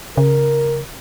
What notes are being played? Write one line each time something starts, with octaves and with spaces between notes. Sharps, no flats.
C#3 A#4